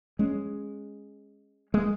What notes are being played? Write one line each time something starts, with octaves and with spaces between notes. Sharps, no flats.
G#3 C#4
G#3